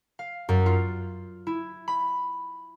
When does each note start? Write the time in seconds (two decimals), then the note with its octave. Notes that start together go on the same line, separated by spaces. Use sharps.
0.19 F5
0.49 F#2
0.66 F4
1.47 E4
1.88 B5